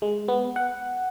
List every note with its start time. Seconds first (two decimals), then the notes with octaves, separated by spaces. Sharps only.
0.02 G#3
0.28 B3
0.56 F#5